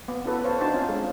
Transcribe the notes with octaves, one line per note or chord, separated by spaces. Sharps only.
B3
C#4 E4 F#4 A4 B4
C5 C#5 F5 A5
D4 D#4 F#4 C5 A5
C4 C#4 F4 F5 G#5 A5
G#3 C#4 D4 G#4 A4